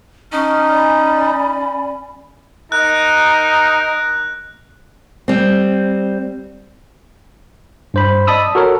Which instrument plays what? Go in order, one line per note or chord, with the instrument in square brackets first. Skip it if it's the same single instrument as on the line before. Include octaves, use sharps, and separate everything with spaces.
[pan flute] C#4 [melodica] D#4 [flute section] A5 C#6 F6
[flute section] D5 G#5 B5
[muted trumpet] D#4 [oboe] A#4 [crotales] F#6
[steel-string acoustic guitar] G3 C4
[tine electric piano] G2 C5 B5
D5 D#5 A5 B5 D#6 E6
F#4 A4 A#4 C#5